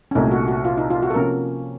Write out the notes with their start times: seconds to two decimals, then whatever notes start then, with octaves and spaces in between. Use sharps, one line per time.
0.11 C#4
0.15 C2 A#2 A3 D#4
0.31 F#4
0.48 F#4
0.65 F4
0.77 D#4
0.90 F4
1.03 F#4
1.10 A4
1.14 C3 F3 A#3 C#4 F4 A#4